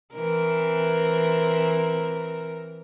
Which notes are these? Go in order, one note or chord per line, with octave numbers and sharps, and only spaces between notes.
E3 C4 A#4